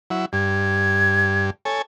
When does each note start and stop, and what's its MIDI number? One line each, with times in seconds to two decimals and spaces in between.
0.10 0.26 54
0.10 0.26 64
0.33 1.50 43
0.33 1.46 92
1.65 1.82 69
1.65 1.82 73
1.65 1.82 80